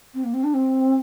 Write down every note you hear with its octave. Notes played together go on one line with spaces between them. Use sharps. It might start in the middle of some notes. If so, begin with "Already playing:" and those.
C4
A#3
C4
D4
C4